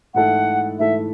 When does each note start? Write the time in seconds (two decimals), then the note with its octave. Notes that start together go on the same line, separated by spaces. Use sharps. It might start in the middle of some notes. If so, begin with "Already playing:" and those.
0.14 G#2 E3 A3 E4 A4 F#5
0.79 G#2 E3 A3 E4 A4 E5